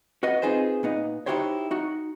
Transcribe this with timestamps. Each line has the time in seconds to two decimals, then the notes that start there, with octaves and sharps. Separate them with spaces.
0.23 F#4 B4 D#5 F#5
0.42 C4 D#4 F4 G#4 B4 C5
0.83 A#2 B3 D#4
1.26 D#4 E4 F#4 G4 C5 C#5
1.71 D#4 F#4